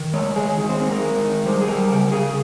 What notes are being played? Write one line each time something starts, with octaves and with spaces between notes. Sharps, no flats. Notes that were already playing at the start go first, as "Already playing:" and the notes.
Already playing: D#3
G#3 C#5
G#3 G#4
D#3
C4
G#3 C4
A#4
G#3
D#3
G3 C5
G#4
G3 A#4
C#3 A#4
C#3 G#4